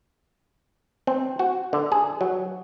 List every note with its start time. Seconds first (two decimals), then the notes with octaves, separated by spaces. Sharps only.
1.07 C4
1.39 F#4
1.73 D3
1.92 G#4
2.21 F#3